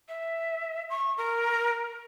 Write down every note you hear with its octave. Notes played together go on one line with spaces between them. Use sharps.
E5
C#6
A#4